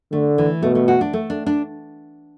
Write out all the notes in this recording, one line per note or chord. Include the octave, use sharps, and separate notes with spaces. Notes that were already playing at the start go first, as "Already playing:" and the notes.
D3 A3
E3
B2 A3
A3
F#4
D4
A3
D4
D4